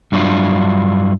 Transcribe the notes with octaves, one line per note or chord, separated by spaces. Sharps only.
G2 F#3 D4 E4 F4